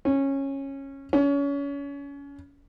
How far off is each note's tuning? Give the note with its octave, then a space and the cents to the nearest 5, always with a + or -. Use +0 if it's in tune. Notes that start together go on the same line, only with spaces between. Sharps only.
C#4 -15
C#4 +30